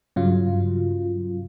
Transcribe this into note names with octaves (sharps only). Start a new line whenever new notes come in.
G2 C#3 F#3 F4